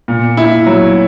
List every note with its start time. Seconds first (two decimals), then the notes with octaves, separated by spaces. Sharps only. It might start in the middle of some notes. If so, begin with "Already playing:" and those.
0.08 A#2
0.37 E4
0.67 F#3